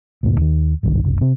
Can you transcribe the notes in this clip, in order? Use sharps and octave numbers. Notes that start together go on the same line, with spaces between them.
D2 G2 A#2 A#3
D#2 D#3
G1 C2 G#2 D#3
F#1 C2
C3 C4